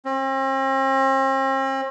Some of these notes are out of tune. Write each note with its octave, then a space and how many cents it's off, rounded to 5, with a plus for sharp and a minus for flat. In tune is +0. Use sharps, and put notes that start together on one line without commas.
C4 +45